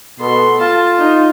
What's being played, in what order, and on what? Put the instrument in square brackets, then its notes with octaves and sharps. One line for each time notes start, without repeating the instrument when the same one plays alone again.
[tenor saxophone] B2 [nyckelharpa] A4 C6
[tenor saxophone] F4 [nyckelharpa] A5
[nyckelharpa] D#4